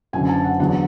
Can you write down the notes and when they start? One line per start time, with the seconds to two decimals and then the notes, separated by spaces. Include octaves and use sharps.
0.13 F#1 F#2 D3 G#5
0.29 A5
0.44 F#5
0.60 E2 D3 F#3 F#5